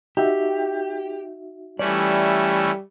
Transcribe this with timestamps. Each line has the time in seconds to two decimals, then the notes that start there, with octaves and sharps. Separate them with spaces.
0.17 D#4 F#4 G4 E5
1.79 E3 G3 A3 C#4 D5